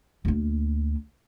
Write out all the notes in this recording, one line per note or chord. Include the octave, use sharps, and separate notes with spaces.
D2 A#3